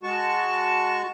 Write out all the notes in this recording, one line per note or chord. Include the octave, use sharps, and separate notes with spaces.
G#3 F#4 A5 C#6